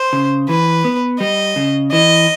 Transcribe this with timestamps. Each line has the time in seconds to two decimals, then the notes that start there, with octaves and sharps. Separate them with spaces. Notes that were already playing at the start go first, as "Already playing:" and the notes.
Already playing: C5
0.13 C#3
0.49 E3 B4
0.85 B3
1.20 G3 D#5
1.56 C#3
1.92 E3 D#5